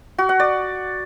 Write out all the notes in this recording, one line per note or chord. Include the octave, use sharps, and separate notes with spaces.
F#4
F#5
D5